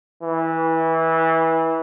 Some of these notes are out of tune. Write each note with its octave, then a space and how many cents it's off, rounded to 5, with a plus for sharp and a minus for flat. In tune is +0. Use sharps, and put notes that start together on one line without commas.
E3 -20